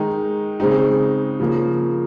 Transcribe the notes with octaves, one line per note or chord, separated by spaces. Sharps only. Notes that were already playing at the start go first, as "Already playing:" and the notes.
Already playing: D#3 G#3 D#4
C#3 G#3 C4 D#4
C#3 F3 A#3